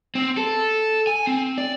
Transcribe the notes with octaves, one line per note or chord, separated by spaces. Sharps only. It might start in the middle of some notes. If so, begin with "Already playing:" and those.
C4
A4
G#5
C4
D5